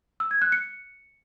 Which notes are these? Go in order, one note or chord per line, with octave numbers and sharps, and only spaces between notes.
E6
G#6
F#6
C#7